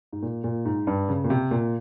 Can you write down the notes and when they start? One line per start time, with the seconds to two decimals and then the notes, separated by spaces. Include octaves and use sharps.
0.12 G#2
0.23 A#2
0.44 A#2
0.65 G#2
0.87 G2
1.09 C#3
1.24 A#2
1.30 C3
1.51 A#2